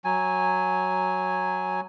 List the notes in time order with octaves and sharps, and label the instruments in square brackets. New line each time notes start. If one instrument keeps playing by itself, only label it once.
[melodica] F#3 G#5